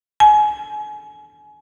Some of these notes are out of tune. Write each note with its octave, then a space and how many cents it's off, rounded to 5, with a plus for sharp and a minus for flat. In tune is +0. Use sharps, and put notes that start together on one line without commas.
G#5 +30